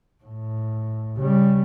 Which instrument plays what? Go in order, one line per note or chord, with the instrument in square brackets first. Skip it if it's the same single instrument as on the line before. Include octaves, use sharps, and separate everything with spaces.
[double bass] A2
C#3 G3